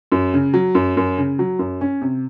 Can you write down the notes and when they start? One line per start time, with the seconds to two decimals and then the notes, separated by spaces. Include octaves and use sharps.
0.12 F#2
0.34 C#3
0.54 F#3
0.75 F#2
0.97 F#2
1.18 C#3
1.39 F#3
1.59 F#2
1.81 C#4
2.02 C3